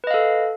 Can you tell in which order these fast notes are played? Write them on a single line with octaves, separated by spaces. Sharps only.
B4 D#5 F5 A4